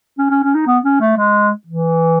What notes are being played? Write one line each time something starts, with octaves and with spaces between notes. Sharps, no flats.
C#4
C#4
C#4
D#4
B3
C#4
A3
G#3
E3